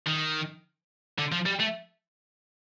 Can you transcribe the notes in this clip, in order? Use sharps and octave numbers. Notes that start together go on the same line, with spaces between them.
D#3
D3
F3
G3
A3